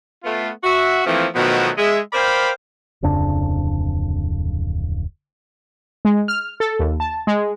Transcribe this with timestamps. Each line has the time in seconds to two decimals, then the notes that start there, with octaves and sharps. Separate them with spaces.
0.24 A3 B3 F4
0.63 F#4 E5
1.06 E3 F3 A3 A#3 C4
1.35 B2 D#3 F3 F#3 A3 B3
1.78 G#3 E5
2.13 A#4 C5 D5 F5 G5 B5
3.02 D1 F2 C#3 D4
6.05 G#3
6.28 F6
6.60 A4
6.79 D#2
7.00 A5
7.27 G#3